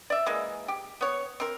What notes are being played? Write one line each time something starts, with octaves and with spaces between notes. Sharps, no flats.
D5 E5
E3 G#3 A#3
G4
B3 C#5
C4 A#4